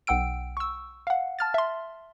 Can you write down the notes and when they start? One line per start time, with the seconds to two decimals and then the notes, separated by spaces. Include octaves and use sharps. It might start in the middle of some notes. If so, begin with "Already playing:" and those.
0.07 B1 F#5 G5 E6 D7
0.57 C#6 E6
1.07 F5 F#5
1.39 A5 F6 A6
1.54 E5 C6